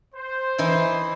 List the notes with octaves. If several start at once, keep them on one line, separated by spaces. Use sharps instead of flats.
C5
E3 D#4 E4